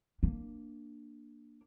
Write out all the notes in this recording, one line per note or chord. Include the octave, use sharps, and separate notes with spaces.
A#3 D4